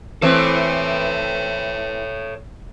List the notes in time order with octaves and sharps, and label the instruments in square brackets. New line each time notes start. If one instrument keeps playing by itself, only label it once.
[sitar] E3 A3 C4 [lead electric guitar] A4 C#5